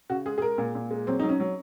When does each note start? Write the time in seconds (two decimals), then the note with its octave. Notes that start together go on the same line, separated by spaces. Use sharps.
0.10 C#3 F#4
0.26 G#3 G#4
0.38 G#4
0.42 G#3 A#4
0.58 A#2
0.75 A#2
0.91 G#3
1.07 F#3 C4
1.19 F#3 D#4
1.29 C#4
1.40 F#3